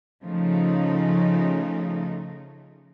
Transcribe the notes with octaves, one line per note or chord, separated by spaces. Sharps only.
C#3 F3 A3 D#4